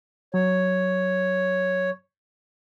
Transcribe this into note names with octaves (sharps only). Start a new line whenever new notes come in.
F#3 C#5